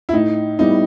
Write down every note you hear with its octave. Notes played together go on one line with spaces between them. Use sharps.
E4
A2 D#4
G3 B3 D#4 E4